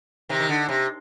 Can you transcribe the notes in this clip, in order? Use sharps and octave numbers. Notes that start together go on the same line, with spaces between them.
C3 D#3
D#3
D3
C3